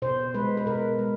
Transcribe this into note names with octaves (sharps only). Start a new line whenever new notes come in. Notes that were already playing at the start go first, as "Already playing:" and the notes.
B2 C5
G#3 B4
B4
B2 A#4
G#3